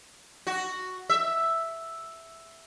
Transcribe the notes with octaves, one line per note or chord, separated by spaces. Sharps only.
F#4
E5